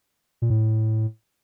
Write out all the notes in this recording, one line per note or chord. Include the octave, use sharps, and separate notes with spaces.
A#2
A2